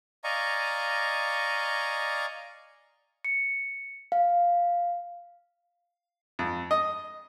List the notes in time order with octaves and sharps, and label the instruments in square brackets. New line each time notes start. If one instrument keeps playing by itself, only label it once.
[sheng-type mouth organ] D5 D#5 F5 G#5 A#5 C#6
[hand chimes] C#7
F5
[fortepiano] F2
D#5